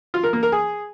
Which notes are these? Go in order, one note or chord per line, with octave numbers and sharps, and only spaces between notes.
F4
A#4
A#3
A#4
G#4